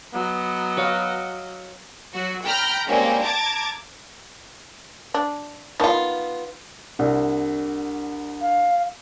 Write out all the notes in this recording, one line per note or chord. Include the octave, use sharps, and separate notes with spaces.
F#3 B3 D#5
F#4 C#5 F5
F#3 F#4
G5 A#5 B5 F6 G6
G3 G#3 A#3 C4 C#4
A5 A#5 D6 G#6 A6
D4
D#3 B3 F4 A5
C2 D4 F#5
F5